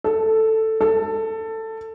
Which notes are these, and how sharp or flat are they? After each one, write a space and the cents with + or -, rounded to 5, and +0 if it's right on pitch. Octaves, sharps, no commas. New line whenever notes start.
A4 +5
A4 +15